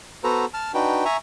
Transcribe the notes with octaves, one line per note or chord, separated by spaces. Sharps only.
B3 F#4 A4 B4 C5 A#5
A5 F6
D4 D#4 F#4 B4 G5
E5 G#5 A#5 C#6